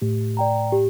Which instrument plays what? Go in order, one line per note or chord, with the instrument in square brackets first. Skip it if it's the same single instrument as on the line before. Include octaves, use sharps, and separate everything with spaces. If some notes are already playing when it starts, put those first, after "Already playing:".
[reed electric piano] A2 [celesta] G4
[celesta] D5 G5 A#5
G4